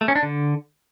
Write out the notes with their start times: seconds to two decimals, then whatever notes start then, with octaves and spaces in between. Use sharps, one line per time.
0.01 A3
0.08 C#4
0.15 D4
0.23 D3